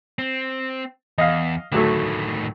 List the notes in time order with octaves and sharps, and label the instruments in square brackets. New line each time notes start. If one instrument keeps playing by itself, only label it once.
[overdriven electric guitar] C4
[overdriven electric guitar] E2 [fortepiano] D#5 F5
[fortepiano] D2 F#3 A3 [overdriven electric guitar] A2 D#3